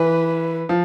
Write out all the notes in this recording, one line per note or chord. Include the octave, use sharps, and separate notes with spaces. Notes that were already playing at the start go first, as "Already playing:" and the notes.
Already playing: E3 B4
F3